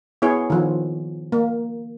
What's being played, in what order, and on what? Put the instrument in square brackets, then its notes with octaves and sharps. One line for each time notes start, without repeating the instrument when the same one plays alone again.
[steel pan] B3 E4 G#4 C#5
D#3 F3
A#3